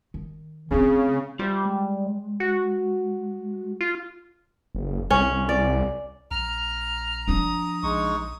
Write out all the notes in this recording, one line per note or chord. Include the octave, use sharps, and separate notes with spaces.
D#3
C#3 A3 C4
G3 F4 C5 E5
G#3
F#4
F4
F#1
C2 C#4
D5
A#1 A#5 F6
F3 D4 D#6
A#1 G#3 D#4 C#6